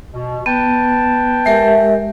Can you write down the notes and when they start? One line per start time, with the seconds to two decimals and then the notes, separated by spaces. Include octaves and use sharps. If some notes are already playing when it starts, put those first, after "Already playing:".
0.13 B2
0.46 B3 B4 G5 A5
1.46 G#3 G4 A#4 E5